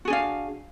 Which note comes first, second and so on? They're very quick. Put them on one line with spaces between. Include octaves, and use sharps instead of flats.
F#4 G#4 D4 F5